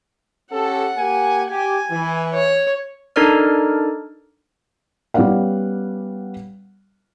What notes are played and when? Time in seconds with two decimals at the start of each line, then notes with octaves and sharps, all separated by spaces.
0.53 C#4 G4 A4 F#5
0.98 A#3 G4 G#5
1.51 G4 G#5
1.91 E3
2.34 C#5
3.16 D4 D#4 A4 A#4 D5 F6
5.14 G3 B3 C#4 D5 F5 F#5